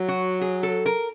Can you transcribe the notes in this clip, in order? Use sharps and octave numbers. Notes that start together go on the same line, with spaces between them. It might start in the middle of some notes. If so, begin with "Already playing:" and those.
Already playing: F#3
F#4
G#4
A4
A#4